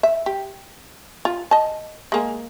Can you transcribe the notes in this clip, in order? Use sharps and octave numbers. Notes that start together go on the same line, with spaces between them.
E5
G4
F4
D#5 A5
G#3 A#3 G#4